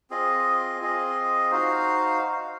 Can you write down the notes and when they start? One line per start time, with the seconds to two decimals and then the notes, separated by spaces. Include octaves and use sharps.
0.10 C4 F4 G#4 D#5
0.80 C4 F4 G#4 D#5
1.51 D#4 F#4 C5 F5